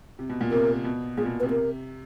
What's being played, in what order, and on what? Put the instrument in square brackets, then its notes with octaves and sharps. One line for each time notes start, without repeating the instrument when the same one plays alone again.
[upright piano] C3
B2
A#2
[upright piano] C3 [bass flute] A#4
[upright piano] B2
[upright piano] A#2 [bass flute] G#4
[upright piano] B2
[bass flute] B4
[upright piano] C3
[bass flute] A#4